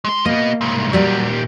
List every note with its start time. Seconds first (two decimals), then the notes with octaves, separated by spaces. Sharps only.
0.04 G#3 C6
0.26 A#3 B3 D#5
0.61 C2 G#2
0.93 A#2 F#3 G3 G4 D5